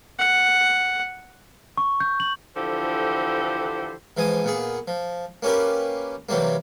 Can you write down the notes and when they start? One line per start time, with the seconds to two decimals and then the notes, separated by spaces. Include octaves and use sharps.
0.19 F#5
1.77 C#6
2.00 G6
2.20 F#7
2.56 D3 E3 F3 G4 A4 C5
4.17 G#2 E3 F3 G#5 D#6
4.44 A#2 B3 G#4
4.88 F3
5.43 A#3 C#4 G4 A#4 B4
6.29 C3 E3 F#3 G3 A#3